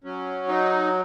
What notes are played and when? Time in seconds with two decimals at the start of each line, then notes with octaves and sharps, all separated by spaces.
0.04 F#3 C#4
0.49 D#4